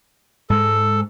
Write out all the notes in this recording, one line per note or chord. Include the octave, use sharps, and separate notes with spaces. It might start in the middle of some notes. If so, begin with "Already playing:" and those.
G#2 G#3 A4